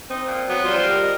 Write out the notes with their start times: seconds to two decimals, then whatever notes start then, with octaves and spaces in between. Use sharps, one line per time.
0.10 C4 D#4
0.27 A#2
0.49 F#3 B3
0.65 G3 F4 G4 C5
0.83 A#4
1.02 D#5